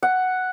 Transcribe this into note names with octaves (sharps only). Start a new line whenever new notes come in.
F#5